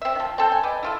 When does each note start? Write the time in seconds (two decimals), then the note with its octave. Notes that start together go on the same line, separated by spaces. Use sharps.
0.02 C4 E5
0.15 D#3 F3
0.38 C4 A4 G5
0.52 G#5
0.63 B4 D5 D#5 G5
0.83 E4 F4 A4